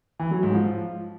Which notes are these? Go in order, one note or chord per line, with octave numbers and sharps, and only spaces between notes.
E3
F#3
G#2
F3